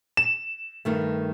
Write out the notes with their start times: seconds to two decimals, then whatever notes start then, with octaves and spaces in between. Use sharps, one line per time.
0.17 E7
0.85 G2 D#3 A3